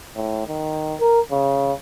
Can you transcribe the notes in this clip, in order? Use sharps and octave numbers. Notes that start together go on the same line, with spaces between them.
A2
D#3
A#4
C#3